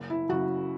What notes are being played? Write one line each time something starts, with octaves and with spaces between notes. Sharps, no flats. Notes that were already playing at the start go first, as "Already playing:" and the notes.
Already playing: F#1
E4
F#2 C#3 F#4